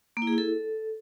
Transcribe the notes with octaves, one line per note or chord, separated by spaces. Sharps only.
A#3
E4
G#4
E4
A4